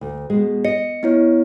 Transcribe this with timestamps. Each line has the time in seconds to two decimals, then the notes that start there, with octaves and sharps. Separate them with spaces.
0.01 D2
0.30 B2 G#3
0.65 D#5 C#7
1.03 B3 E4 C#5